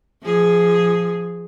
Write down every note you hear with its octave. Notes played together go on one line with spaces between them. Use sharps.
F3 G#4